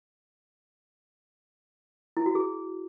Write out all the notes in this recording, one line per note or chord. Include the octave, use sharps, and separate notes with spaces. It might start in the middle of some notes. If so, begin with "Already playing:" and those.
E4
F#4
G#4